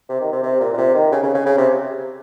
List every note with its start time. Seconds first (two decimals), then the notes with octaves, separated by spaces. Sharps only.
0.09 C3
0.21 D#3
0.33 C3
0.43 C3
0.61 A#2
0.73 A#2
0.78 C3
0.95 D#3
1.12 C#3
1.23 C#3
1.35 C#3
1.46 C#3
1.58 C3